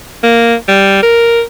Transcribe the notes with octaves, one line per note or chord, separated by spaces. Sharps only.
A#3
G3
A#4